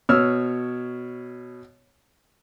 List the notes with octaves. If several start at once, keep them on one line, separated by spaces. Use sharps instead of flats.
B2 C#5 E6 F6